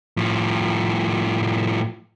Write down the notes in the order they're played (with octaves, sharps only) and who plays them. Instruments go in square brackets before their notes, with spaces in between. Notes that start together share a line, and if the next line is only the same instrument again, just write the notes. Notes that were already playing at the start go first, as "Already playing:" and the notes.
[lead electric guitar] A2 F3